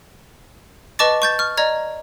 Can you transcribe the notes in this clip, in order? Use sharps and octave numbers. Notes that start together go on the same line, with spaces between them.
B4 D#5 A5 C#6 D6 A6
C#6 G6 A6
C#6 F6
D5 D#5 A#5 G#6